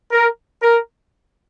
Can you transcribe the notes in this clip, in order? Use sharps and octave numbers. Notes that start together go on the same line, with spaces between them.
A#4
A#4